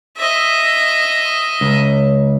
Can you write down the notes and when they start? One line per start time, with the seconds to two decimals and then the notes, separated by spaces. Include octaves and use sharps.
0.17 D#5 E5
1.61 C#2